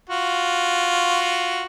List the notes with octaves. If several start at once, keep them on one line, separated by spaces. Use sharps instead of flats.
F4 F#4